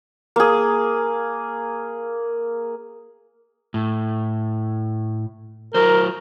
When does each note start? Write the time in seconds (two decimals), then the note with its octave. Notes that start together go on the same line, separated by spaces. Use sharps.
0.36 A#3 G#4
3.74 A2
5.75 F#3 A#4 C5